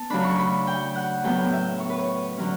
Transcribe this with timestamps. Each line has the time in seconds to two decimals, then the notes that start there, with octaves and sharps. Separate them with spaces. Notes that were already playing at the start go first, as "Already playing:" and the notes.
Already playing: B3 A5
0.10 C#3 F#3 A3 D4 B5
0.24 C#6
0.38 B5
0.67 G5
0.95 F#5
1.24 A2 F#3 B3 G5
1.53 E5
1.80 C#5
1.90 B4
1.99 C#5
2.37 D3 F#3 C#4